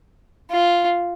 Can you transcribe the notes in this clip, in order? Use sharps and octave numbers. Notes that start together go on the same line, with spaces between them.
F4